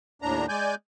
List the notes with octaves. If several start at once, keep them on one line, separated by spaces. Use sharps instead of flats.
D#2 A2 D4 A#5
G#3 D5 G#5 G6